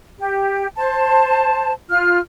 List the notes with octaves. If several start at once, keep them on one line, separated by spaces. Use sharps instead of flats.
G4
C5 A5
F4 F6